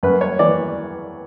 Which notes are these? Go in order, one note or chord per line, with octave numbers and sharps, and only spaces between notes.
F#2 B4
C#5
E3 D5